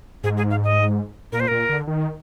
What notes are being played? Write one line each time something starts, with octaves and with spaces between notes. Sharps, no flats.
G#2 G#4
G#4
F5
D#5
A#2 A#4
C5
A#2 A#4
D3
D#3